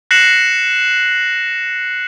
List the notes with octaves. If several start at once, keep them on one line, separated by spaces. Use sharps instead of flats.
F#6 A#6 C7 C#7 E7 F#7